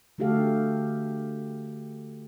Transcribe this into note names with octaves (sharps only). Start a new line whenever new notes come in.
D3 A3 F#4 G4 A4 F5